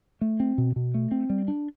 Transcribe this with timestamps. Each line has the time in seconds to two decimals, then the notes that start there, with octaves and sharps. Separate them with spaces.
0.21 A3
0.40 C4
0.58 B2
0.76 B2
0.94 A3
1.11 C4
1.30 G3
1.48 D4